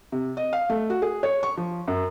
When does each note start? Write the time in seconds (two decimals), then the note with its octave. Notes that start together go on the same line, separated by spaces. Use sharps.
0.12 C3
0.37 D#5
0.53 F5
0.69 A3
0.90 F#4
1.02 G#4
1.23 C#5
1.43 C#6
1.57 F3
1.88 F#2